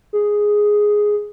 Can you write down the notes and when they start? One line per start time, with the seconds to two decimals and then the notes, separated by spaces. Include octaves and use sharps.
0.13 G#4